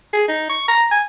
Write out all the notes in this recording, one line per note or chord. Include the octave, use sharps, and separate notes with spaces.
G#4
D#4
C#6
A#5
G#5